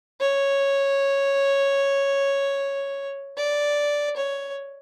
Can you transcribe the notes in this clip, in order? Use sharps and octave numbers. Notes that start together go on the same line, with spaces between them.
C#5
D5
C#5